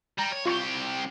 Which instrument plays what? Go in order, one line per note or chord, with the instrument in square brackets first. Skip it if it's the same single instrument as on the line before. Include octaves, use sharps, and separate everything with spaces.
[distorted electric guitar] G3 [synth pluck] A#5
[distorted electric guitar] C#5
[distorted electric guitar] C2 G4 [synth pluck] F4 C#6